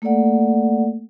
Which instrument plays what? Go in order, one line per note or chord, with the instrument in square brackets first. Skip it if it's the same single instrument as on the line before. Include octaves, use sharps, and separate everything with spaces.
[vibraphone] A3 A#3 A4 D5 F#5